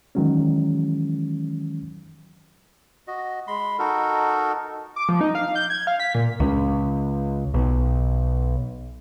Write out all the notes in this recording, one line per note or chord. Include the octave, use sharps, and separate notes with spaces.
D#3 E3 F#3 G#3 C#4
F#4 D#5
G#3 B5 C6
D#4 F#4 A4 A#4
D6
F3
D#4
F5
G6
G#6
F5
B6
A#2
C#2
B1